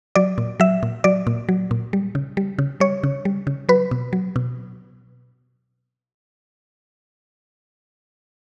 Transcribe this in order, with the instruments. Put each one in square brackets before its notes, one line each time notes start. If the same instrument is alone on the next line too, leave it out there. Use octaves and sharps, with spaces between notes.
[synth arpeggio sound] F#3 D5
A#2
F#3 E5
A#2
F#3 D5
A#2
F#3
A#2
G3
C#3
G3
C#3
G3 C#5
C#3
G3
C#3
F#3 B4
B2
F#3
B2